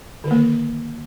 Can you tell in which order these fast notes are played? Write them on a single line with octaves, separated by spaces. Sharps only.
D3 D#3 A#3